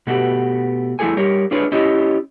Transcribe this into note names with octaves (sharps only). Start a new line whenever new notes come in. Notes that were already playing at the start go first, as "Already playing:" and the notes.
B2 A3 B3 F#4 G4
F3 A3 E4 G#4 A4 G#5
G3 G4 A#4 C#5
D4 F4 G#4 B4 C#5
C#4 E4 F4 G4 C#5 D#5